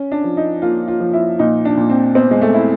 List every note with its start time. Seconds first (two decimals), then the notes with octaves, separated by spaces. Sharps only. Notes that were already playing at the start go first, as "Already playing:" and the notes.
Already playing: C#4
0.11 D4
0.24 F3
0.37 D#4
0.62 A#3 F4
0.88 F4
1.00 F3
1.13 E4
1.39 A#2 D#4
1.65 D4
1.77 A#2
1.89 C4
2.15 B3 C4
2.31 G#3
2.41 A3
2.54 E4